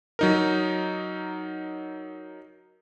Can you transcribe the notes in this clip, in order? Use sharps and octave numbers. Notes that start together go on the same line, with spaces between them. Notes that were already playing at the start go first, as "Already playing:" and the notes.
F#3 D#4 A#4